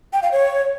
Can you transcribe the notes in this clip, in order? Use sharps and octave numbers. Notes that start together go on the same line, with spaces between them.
G5
F5
C#5